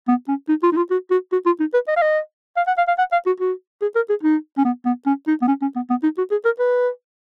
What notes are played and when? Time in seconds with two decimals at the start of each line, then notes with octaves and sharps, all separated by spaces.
0.08 B3
0.28 C#4
0.49 D#4
0.63 F4
0.72 D#4
0.77 F4
0.91 F#4
1.11 F#4
1.32 F#4
1.46 F4
1.60 D#4
1.74 B4
1.88 D#5
1.96 F5
2.02 D#5
2.57 F5
2.67 F#5
2.78 F5
2.88 F5
2.98 F#5
3.12 F5
3.26 F#4
3.40 F#4
3.82 G#4
3.95 A#4
4.09 G#4
4.23 D#4
4.58 C#4
4.65 B3
4.85 B3
5.06 C#4
5.27 D#4
5.42 B3
5.48 C#4
5.62 C#4
5.76 B3
5.90 B3
6.03 D#4
6.18 F#4
6.31 G#4
6.45 A#4
6.59 B4